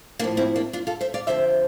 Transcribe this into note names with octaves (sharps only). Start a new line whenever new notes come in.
A2 F3 A#3 D4
C4 E4
A#3 D4
D4 F4
F4 A4
C5 E5
D5 F5
F2 D3 F3 C5 E5